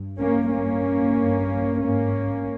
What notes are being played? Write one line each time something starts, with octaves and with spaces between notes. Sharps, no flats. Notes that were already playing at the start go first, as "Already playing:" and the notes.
Already playing: G2
A#3 C#4
G2 A#3 C#4
G2
G#2 A#3 C#4